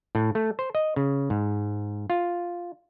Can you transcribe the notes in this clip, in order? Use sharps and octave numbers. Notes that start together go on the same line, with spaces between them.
A2
A3
C5
D#5
C#3
G#2
F4